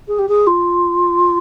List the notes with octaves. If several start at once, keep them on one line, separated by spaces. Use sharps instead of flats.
G#4
G4
G#4
F4